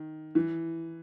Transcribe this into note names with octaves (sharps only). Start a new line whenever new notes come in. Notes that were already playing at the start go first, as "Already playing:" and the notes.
Already playing: D#3
E3